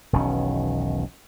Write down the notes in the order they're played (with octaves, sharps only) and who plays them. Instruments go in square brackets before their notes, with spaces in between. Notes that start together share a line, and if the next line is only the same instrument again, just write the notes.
[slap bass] E1 B1 D#3 C#4